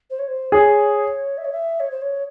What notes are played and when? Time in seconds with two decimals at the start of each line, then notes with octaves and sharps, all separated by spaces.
0.10 C5
0.19 C#5
0.28 C5
0.52 G#4 C#5
1.38 E5
1.45 C#5
1.52 E5
1.80 C#5
1.91 C5
2.02 C#5